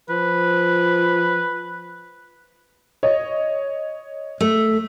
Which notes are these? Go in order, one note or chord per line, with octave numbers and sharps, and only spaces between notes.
F3 B4
C#5 D#5
A3